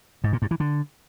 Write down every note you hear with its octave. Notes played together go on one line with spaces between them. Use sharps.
G#2
A#2
G2
E3
D3